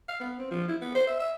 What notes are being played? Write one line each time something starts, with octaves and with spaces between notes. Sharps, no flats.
F5
B3
C4
F3
E4
B3
C5
E5
E5